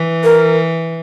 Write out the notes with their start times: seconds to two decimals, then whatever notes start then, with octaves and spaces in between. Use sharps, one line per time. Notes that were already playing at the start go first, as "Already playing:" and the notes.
Already playing: E3
0.24 A#4